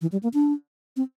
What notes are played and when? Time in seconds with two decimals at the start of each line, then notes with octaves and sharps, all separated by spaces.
0.01 E3
0.12 G3
0.23 A#3
0.34 D4
0.97 C4